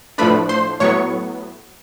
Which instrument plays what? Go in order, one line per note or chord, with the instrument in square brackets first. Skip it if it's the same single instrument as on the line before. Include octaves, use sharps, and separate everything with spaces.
[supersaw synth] A2 F3 A3 D4 B4 B5
C5 C6
A2 F#3 B3 C#5 C#6